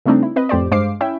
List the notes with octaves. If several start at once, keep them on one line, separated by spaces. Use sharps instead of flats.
C#3 G3 A3 C4 D4 D#4
E4
C4 B4 D#5
F2 A2 G4 C5 D5
G2 G#3 C5 F5 D6 C7
C#4 E4 E5 G5